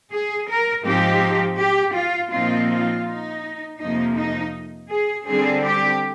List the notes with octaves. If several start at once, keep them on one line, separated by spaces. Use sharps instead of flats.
G#4
A#4
G#2 F3 C4 D#4 G4
G4
F4
A#2 F3 C4 D#4 F4
F4
D#4
F2 C3 F3 A#3 D#4
D#4
G#4
D3 G3 C4 G#4
G4